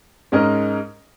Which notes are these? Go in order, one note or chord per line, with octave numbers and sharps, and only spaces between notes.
G#2 G#3 C#4 A#4 D#5